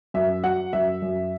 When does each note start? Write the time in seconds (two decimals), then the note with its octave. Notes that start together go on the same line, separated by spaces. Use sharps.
0.14 F#2 E5
0.44 F#3 F#5
0.73 F#2 E5
1.02 F#2